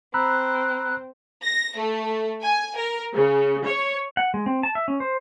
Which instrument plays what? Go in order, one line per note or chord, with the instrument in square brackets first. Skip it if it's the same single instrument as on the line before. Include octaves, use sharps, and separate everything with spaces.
[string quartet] C4 [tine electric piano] A#5 B5 E6 [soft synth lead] F#6
[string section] A#6
A3
G#5
A#4
C#3
C#5
[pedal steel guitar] F#5
G#3
C4
A5
E5
C#4
C5